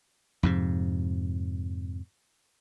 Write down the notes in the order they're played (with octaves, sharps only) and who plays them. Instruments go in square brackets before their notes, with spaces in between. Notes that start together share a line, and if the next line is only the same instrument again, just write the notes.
[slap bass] F2 G#2 C3